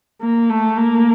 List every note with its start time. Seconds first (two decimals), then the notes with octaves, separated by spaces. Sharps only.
0.21 A#3
0.49 A3
0.77 A#3